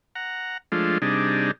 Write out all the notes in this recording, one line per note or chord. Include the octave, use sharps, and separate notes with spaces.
F#5 A#5
F3 G#3 A3 D4 F4
C3 G3 D4 D#4 G#4